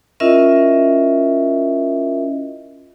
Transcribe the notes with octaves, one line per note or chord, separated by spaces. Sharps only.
C#4 E4 F4 A#4 D#5 E5